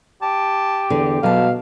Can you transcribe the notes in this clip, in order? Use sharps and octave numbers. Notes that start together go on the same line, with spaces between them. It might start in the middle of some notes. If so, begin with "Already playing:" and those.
G4 A5
E2 D3
B2 F#3 F5 A5